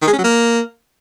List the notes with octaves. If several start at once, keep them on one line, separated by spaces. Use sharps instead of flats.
D#3
G#3
C#4
F#3
A#3